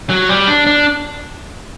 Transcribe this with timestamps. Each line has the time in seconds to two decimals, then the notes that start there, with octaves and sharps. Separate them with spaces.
0.10 F#3
0.29 G3
0.48 D4
0.67 D4